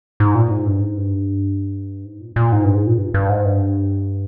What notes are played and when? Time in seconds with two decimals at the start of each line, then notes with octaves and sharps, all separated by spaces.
0.20 G#2
0.35 A#2
0.51 G#2
0.66 G2
0.81 G#2
0.97 G2
2.05 G#2
2.21 A#2
2.36 A#2
2.52 G#2
2.64 G2
2.75 G#2
2.87 A#2
2.98 G2
3.14 G2
3.29 G#2
3.45 G2